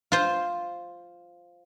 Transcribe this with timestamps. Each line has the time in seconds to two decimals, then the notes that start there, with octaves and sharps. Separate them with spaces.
0.12 F4 C5